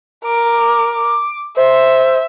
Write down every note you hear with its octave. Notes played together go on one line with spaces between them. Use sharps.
A#4 D6
C5 E5